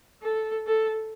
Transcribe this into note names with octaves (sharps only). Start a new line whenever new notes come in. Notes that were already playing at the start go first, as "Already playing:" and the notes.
A4
A4